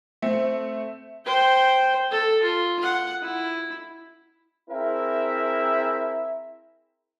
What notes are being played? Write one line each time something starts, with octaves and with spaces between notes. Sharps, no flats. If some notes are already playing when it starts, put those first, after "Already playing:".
A3 C4
C5 G5
A4
F4
F#5
E4
C4 E4 G#4 A#4 E5